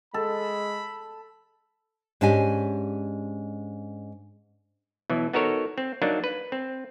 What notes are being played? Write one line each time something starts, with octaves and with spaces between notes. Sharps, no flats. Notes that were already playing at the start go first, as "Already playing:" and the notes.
G#3 A4 B5
G#2 C#4 D4 G4 D#5 G#5
B2 E3 F#3
B3 D#4 F#4 A4 A#4 C#5
C4
F#3 A#3 D4 D#4
B4
C4